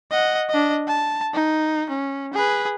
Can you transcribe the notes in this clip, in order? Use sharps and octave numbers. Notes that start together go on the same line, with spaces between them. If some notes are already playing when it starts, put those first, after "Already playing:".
D#5 F#5
D4 D#5
A5
D#4
C#4
G#4 B4